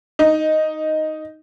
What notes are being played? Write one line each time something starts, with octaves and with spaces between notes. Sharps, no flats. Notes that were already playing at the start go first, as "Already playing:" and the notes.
D#4